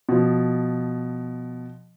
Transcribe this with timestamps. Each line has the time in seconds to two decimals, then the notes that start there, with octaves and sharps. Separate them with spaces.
0.09 B2 F3